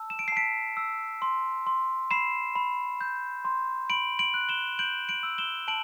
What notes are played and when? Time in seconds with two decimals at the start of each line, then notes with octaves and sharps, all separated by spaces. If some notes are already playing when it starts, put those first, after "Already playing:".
Already playing: A5 E6
0.10 E7
0.19 D7
0.28 C7
0.32 A5 B6 D7
0.77 E6
1.22 C6
1.67 C6
2.11 B5 C7 E7
2.56 B5
3.01 G6
3.45 C6
3.90 B5 D7 F#7
4.19 D7 F#7
4.34 F#6
4.49 E7 G7
4.79 G6 D7 F#7
5.09 D7 F#7
5.23 E6
5.38 E7 G7
5.68 A5 D7 F#7